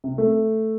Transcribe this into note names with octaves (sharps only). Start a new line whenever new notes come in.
C3
A3